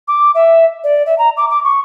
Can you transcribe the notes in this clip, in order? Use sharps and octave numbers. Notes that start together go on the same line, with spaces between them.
D6
E5
D5
E5
A#5
D6
D6
C#6